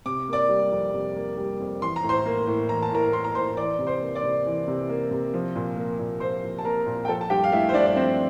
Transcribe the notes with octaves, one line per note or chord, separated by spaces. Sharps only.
C3 D6
A#3 D5 D6
G3
F2
C3
A#3
G3
F2
E3 C6
A#5
A2
C5 C6
A#3
A2
E3 A#5
A5
A2 A#4 A#5
A#3 C6
A#5
A2 C5 C6
E3 D5 D6
C3
C5 C6
A#3
D5 D6
C3
E3
C3
A#3
C3
F3
A#2
A#3
A#2
F3 C5 C6
A#2
A5
A#3 A#4 A#5
A#2
G5
F3 A4 A5
A5
G2 G4 G5
F5
A3 E4 E5
C5
G2 D4 D5
D5
F3 C4 C5